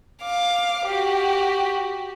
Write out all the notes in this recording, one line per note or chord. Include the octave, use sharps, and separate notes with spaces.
F5 D6
F#4 G4